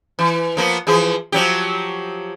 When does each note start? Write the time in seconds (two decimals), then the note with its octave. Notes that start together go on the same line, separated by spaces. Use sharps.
0.19 E3
0.57 F3 A#3 B3
0.87 E3 F3 G#4
1.32 F3 F#3 G4